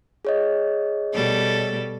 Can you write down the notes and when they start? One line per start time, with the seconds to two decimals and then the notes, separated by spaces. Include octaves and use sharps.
0.25 G#4 C#5 D#5
1.13 B2 G3 A4